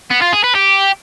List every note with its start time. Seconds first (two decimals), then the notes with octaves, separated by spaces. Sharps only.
0.10 B3
0.21 F4
0.32 G#4
0.44 B4
0.55 G4